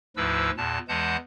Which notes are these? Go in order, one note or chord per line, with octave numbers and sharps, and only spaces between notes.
D2 G#2 F3 E4 B4 E6
E2 A#2 A5
E2 E3 G#3 F#5 A5 G6